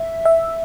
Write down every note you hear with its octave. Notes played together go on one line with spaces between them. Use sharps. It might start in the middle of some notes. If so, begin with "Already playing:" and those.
Already playing: E5
E5